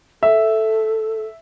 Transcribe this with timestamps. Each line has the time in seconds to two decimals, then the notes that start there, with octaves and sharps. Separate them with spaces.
0.23 A4 E5